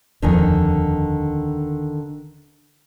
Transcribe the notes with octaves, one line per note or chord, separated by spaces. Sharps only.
D#1 F2 D3 D#3 G#5